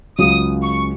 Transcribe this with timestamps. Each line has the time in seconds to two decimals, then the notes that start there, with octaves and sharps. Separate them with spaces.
0.19 C#2 C#3 F#3 D#6
0.62 C#6